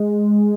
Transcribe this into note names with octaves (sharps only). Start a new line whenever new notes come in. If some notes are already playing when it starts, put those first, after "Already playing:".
Already playing: G#3